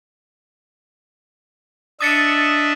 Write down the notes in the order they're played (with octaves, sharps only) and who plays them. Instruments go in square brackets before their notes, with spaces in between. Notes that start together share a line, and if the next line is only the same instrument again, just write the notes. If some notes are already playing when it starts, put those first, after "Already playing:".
[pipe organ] D4 D#5 E5 [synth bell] D#6 A6 C#7